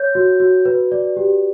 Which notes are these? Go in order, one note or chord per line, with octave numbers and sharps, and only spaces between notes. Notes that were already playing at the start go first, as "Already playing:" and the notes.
Already playing: C#5 G6
F#4
F#4
B4
D5
G4